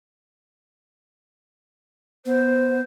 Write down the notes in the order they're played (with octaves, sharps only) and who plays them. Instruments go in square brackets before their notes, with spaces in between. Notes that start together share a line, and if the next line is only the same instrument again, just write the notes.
[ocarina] B3 [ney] C5